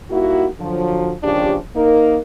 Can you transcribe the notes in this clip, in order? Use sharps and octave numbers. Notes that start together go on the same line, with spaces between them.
G3 A#3 D#4 E4 F#4
D3 F3 F#3
D#2 C#3 F3 D4 G4
A#3 D#4 A#4